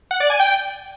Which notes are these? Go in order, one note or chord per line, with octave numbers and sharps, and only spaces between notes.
F#5
D5
G#5
G5